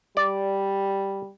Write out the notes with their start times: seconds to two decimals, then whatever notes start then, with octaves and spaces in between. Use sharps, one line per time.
0.17 G3 D5